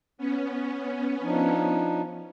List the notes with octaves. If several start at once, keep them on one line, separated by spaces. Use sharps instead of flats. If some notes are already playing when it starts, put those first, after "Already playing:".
B3 C#4
F3 D4 D#4